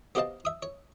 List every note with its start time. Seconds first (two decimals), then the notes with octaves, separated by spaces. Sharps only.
0.15 B3 G4 C5 D#5 F5 A5
0.45 E5 D#6
0.63 C#5